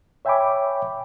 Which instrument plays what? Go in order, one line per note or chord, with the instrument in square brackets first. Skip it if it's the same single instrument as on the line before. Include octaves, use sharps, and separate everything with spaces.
[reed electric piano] C#5 E5 G5 G#5 B5 D6